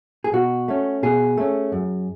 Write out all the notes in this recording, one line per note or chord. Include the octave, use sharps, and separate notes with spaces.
G#4
B2 F#4
A3 C#4
B2 G#4
A3 C#4
F#2